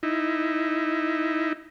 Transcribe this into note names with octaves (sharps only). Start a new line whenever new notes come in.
D#4 E4